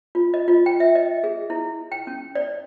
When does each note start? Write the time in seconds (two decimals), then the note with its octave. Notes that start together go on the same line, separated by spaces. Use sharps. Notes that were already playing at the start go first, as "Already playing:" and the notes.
0.15 F4
0.34 D#5
0.48 F4
0.66 G5
0.80 E5
0.95 D#5
1.24 G#4
1.50 E4
1.92 G5
2.07 C#4
2.35 D5